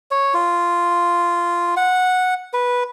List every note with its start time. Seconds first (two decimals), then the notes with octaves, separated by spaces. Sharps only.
0.11 C#5
0.34 F4
1.77 F#5
2.53 B4